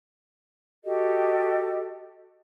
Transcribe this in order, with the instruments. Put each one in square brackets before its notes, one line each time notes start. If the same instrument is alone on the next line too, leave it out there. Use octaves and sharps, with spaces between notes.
[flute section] F#4 G4 A4 D#5